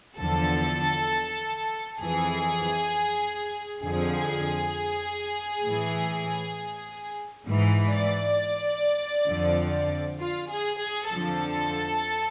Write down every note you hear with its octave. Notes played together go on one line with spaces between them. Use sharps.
E2 D3 F3 A4
F2 E3 G#4
F2 D3 F3 G#4
A2 E3
G#2 E3
D5
F2 D3 F3
F4
G#4
G#4
F2 D3 F3 A4